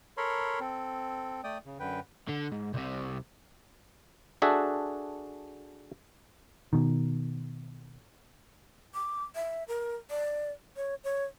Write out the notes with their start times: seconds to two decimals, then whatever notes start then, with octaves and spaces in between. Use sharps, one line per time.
0.17 A4 A#4 C#5 B5 C6
0.60 C4 A4
1.44 A3 D5 G5 D#6
1.65 C#3
1.80 F#2 D3 B4 G5
2.29 D3
2.52 G#2
2.74 C2 C3
4.42 D4 F#4 G#4 A4 E5
6.73 B2 D#3
8.94 D6
9.35 E5
9.68 A#4
10.10 D5
10.76 C#5
11.04 C#5